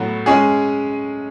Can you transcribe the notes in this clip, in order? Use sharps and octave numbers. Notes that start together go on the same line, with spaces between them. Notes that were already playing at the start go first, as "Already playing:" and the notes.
Already playing: A2 F#3 B3
G#3 C#4 G#4